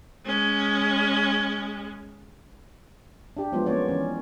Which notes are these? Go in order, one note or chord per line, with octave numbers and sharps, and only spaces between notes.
G#3 C#4
D4 G4
F3 F#3 G#3 B3 F4
A#3 B3 C#4 C#5 D5
E3 C#4